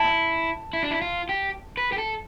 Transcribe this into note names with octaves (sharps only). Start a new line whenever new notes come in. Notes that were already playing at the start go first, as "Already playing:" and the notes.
Already playing: E4 A5
E4
D4
E4
F4
G4
B4
G4
A4